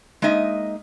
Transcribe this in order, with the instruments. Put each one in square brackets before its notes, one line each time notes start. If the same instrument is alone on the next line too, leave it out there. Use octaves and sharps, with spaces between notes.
[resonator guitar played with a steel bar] G#3 A#3 D#4 D#5 E5